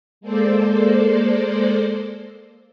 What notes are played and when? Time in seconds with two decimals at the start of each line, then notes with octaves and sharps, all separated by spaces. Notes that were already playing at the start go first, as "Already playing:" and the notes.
0.21 G#3 A#3 A4 C5 D5